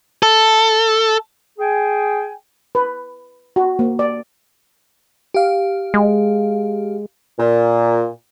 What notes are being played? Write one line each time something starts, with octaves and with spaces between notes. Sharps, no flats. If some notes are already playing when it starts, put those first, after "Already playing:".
A4
G#4 G5 G#5
B4
F#4
A#3
D5
G4 F5
G#3
A#2